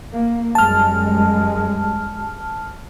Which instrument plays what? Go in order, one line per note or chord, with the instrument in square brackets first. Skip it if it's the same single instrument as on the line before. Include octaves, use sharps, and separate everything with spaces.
[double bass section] A#3
[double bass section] F#2 G3 G#3 [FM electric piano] A5 F6